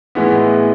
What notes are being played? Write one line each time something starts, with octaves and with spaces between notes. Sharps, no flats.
A2 E3 G#3 B3